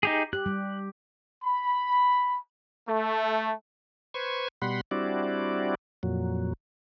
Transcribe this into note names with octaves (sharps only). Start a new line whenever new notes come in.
D#4 G4 G#4
G4 F#6
G3
B5
A3
B4 C5 C#6 G#6
B2 G3 F#5 B5 C6
G3 C4 D4 E4 F#4 D5
F2 A#2 F#3